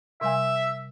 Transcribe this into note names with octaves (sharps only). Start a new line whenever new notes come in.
C3 G3 E5 G#5